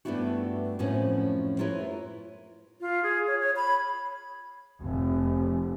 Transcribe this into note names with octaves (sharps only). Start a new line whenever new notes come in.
G2 A3 B3 D4 E4 F#4
F#2 A2 F3 C4 C#4
E4 F4 A#4 B4 C#5
F4
G#4
C#5
C#5
B5
F1